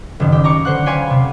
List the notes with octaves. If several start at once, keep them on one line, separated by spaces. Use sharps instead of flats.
F#1 D#3
G4
A#5 C#6 D6 C#7
D3 C5 F#5 F#6
C#5 F5 G5 G#5 B5 C6
C3